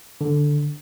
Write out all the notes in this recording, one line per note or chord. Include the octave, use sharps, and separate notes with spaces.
D3